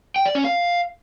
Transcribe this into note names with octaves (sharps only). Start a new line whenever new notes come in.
G5
D5
C#4
F5